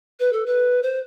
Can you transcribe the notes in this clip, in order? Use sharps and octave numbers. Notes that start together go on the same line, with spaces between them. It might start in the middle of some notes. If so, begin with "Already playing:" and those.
B4
A4
B4
C5